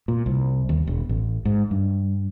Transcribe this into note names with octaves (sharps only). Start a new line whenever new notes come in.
A#2
C2
D#2
E1
A1
G#2
G2